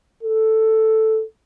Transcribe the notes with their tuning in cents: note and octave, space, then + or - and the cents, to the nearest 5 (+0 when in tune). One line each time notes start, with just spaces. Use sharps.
A4 +0